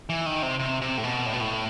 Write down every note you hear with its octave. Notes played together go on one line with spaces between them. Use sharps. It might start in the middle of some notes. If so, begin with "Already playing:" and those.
E3
D#3
C3
C3
C3
A2
B2
A2
B2
A2